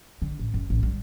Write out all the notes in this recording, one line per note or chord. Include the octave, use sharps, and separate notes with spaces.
D3
A1
F#1
A1
G3